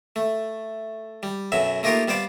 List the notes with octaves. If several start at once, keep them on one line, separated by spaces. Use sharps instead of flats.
A3
G3
B1 F#2 F#3 E5
A3 A#3 D#4 F4 G4 A#4
G3 B3 C5 D5 F5